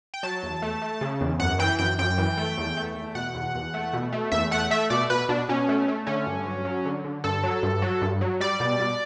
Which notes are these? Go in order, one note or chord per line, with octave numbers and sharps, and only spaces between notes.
G5
F#3 A5
E2
A3
A3
C#3
E2
F#2 F#5
E3 G5
F#2 G5
F#2 G5
E3
A3
E2
A3
E2
B2 F#5
E2
E2
A3
B2
A3
E2 E5
A3 F#5
A3 E5
B2 D5
B2 B4
B2 D4
B2 C#4
A3
A3
D3 C#4
G2
F#3
F#3
D3
D3
G2 A4
F#3
G2
F#3
G2
F#3
G3 D5
B2
B2